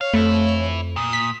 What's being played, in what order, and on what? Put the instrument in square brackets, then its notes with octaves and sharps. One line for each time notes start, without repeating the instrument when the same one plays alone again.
[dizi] C#5 [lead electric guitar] F5
[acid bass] F2 [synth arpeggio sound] A3 [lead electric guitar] B4 E5
[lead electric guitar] A#2 [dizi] D#6
[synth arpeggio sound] B6